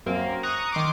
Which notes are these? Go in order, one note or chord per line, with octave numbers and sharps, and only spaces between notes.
F#2 A#3 C4
A#5 C#6 D#6 F#6
D#3 C6 D6